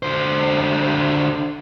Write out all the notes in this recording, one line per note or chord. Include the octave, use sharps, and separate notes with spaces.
D3 C5